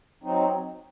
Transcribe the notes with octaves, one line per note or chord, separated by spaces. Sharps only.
F#3 C4 D#4